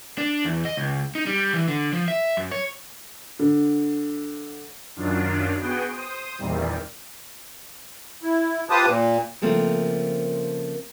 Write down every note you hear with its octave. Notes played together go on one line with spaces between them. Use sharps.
D4
E2
D#5
C#2
D#4
G3
E3
D3
F3
E5
F#2
C#5
D3
F#2 D#3 F#3 D4 F4
B3 F#4 G#4 G5
C5 D#6
E2 A#2 D#3 G3 C4
E4
F4 G4 B4 C5 A5 D#6
A#2
C#3 F3 A3 A#3 C4